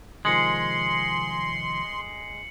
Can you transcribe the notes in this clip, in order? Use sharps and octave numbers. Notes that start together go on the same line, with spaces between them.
C3 D#3 F3 G#3 C6 C7 C#7 F#7